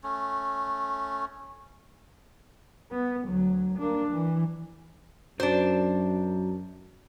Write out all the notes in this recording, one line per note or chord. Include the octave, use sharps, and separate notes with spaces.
A3 C#4
B3
D2 F#3
A#3 D4
E3
F#2 F#3 D4 C5